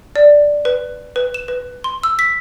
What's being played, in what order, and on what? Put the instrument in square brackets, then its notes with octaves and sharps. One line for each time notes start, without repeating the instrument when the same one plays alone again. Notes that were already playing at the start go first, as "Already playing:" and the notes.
[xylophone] D5
B4
B4
E7
B4
C6
E6
B6